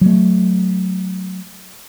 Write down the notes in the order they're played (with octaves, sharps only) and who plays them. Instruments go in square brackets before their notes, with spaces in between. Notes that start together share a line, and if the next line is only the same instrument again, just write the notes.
[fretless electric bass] F#3 A3